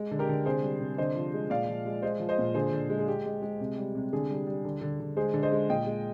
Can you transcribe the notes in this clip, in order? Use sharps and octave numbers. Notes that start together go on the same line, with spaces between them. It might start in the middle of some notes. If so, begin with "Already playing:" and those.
Already playing: G#3
D3
G4 A#4
D3
C3 G#4 C5
G3
C3
D3 C5 D#5
F3
G#3
A#2 D5 F5
F3
G#3
G#3 C5 D#5
F3
C5 D#5
A#2
D3 G#4 C5
D3
G#3
G#4
G#3 G4
G#3
G#3
C3
G3
C3
D3 G#4
G3
G3
D3
D3
D3
G#3 G#4 C5
D3
C5 D#5
G#3
A#2 D#5 G5
G#3